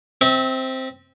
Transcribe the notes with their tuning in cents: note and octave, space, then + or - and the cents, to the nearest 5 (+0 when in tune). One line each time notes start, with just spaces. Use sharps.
C4 +0 E5 -35